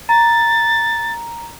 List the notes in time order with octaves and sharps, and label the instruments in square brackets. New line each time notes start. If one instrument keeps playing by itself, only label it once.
[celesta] A#5 [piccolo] A6